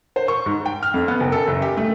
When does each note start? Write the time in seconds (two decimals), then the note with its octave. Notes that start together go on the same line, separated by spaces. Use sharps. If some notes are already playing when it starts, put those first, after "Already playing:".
0.16 C5
0.28 C#6
0.46 G#2
0.66 G5
0.83 F6
0.94 F2
1.08 B3
1.20 F#1
1.32 A4
1.48 F#1
1.62 G4
1.77 A3